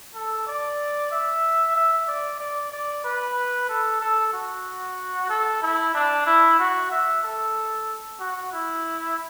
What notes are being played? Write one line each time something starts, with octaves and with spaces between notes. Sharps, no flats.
A4
D5
E5
E5
D5
D5
D5
B4
A4
A4
F#4
A4
E4
D4
E4
F#4
E5
A4
F#4
E4